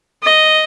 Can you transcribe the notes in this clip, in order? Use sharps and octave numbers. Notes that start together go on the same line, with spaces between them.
D#5